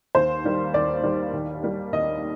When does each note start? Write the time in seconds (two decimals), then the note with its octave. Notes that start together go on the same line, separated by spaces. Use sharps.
0.15 D#2 C5
0.44 D#3 G3 A#3
0.74 D#2 D5
1.03 D#3 G3 A#3
1.33 D#2
1.63 D#3 G3 A#3
1.92 D#2 D#5